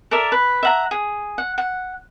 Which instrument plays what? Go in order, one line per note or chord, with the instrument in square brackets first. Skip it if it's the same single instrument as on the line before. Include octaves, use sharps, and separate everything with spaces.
[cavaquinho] A4 A#4 D5 E5
B4
E5 F#5 A#5
G#4
F#5
F#5